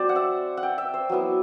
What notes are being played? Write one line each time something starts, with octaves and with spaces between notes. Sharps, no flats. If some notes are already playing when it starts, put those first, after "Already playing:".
Already playing: F#3 C4 C5 D5
F#5
E5
F#5
G5
E5
C5
F#3 B3 E4